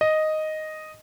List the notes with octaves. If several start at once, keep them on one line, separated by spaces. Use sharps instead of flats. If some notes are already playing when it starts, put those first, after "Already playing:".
D#5